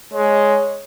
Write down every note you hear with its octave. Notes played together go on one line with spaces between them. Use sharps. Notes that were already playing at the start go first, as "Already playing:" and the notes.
G#3 C#5